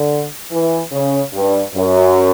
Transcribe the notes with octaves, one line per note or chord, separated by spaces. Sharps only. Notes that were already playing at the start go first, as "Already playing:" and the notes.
Already playing: D3
E3
C#3
G2
F#2